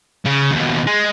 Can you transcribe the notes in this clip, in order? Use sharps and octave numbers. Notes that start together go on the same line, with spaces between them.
C#3
D#2 B2
G#3